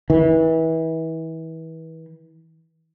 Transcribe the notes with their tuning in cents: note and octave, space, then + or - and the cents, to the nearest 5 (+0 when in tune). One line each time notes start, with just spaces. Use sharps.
E3 -30